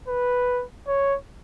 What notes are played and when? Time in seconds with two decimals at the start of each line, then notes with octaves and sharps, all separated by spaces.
0.08 B4
0.88 C#5